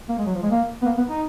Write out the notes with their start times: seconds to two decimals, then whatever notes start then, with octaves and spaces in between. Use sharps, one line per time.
0.09 A#3
0.18 G#3
0.26 F#3
0.35 F3
0.43 G#3
0.51 A#3
0.82 B3
0.86 A#3
0.97 B3
1.08 D#4